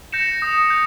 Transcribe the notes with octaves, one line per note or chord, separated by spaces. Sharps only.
G6 A#6 C#7 E7
D#6
G6